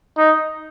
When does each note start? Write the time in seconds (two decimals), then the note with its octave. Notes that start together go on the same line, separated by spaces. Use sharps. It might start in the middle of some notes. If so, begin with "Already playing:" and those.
0.18 D#4